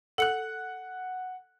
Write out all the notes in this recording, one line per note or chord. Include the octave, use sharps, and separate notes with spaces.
A4 F#5 F#6 C#7 F#7